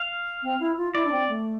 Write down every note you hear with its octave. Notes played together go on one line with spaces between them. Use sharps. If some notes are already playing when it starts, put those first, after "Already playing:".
Already playing: F5
C4
E4
F4
E4 D5
D4
C4
A3